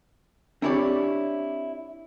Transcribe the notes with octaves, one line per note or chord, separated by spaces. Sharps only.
C4 D4 E4 G4 C#5 D5